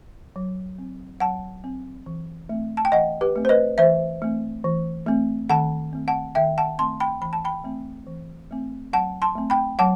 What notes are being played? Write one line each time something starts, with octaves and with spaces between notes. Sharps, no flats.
F#3
C4
F#3 F#5 A5
C4
E3
A3 C4
A5
G5
E3 D#5 F#5
G4 B4
A3 C4
C5
B4 D#5
E3 C5 E5
A3 C4
E3
A3 C4
D#3 F#5 A5
A3 C4
F#5 A5
D#3 E5 G5
F#5 A5
A3 C4 A5 C6
G5 B5
E3 B5
A5
G5 B5
A3 C4
E3
A3 C4
F#3 F#5 A5
A5 C6
A3 C4
G5 B5
F#3 F#5 A5